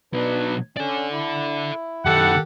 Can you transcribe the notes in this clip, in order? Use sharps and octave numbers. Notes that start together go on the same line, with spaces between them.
B2 F#3 D4 B4
C#4 A4 D5
E4
F#2 D#3 G4 A4 F#5